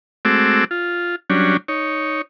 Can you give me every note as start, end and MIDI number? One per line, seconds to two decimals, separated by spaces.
0.25 0.64 56
0.25 0.64 57
0.25 0.64 60
0.25 0.64 66
0.25 0.64 86
0.25 0.64 88
0.71 1.16 65
1.30 1.57 54
1.30 1.57 55
1.30 1.57 61
1.30 1.57 62
1.68 2.22 63
1.68 2.22 73